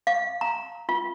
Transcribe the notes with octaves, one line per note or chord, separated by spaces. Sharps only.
F5
A#5
F4